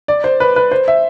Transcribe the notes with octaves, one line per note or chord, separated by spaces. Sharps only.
D5
C5
B4
B4
C5
E5